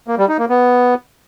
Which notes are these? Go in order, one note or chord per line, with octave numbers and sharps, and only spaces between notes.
A#3
G3
D#4
A#3
B3